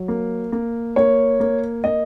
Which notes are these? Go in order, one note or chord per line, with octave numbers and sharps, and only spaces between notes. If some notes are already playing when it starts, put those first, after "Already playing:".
Already playing: F#3
A#3
A#3
A#3 C#5
A#3
A#3 D#5